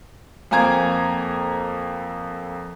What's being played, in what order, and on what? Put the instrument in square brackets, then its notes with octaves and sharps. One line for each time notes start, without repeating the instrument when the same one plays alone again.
[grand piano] F2 A#3 C4 G#5 A#5 G#6